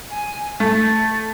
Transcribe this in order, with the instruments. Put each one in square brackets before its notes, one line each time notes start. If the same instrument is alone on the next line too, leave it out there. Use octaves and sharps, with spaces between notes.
[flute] G#5
[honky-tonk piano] A3 [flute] A6